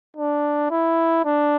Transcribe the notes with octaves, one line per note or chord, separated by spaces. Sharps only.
D4
E4
D4